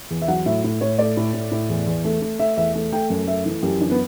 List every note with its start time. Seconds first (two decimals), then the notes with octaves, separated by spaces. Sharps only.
0.11 E2
0.22 E5
0.28 F#3 F#5
0.46 A2 E5
0.64 A2
0.81 A2 C#5
0.98 A3 D5
1.17 A2
1.34 A2
1.51 A2
1.69 E2
1.87 E2
2.04 A3
2.22 A3
2.39 A3 E5
2.57 E2 E5
2.75 A3
2.92 A3 G5
3.10 F#2
3.27 A3 E5
3.45 E3
3.62 F#2 G4
3.81 E3 D4
3.91 B3